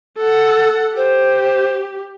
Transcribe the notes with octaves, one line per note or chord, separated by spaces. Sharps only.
A4 F#5
G4 C5